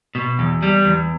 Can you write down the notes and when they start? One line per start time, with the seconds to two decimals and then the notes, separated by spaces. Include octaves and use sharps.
0.15 B2
0.39 E2
0.63 G3
0.85 E2